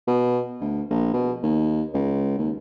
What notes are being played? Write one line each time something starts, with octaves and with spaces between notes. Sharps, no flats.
B2
D2
A#1
B2
D#2
C#2
D#2